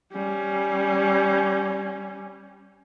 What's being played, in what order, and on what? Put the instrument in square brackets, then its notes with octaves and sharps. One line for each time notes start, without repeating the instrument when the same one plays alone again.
[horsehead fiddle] G3 C#4